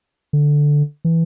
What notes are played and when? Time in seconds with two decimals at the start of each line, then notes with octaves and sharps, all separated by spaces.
0.33 D3
1.05 E3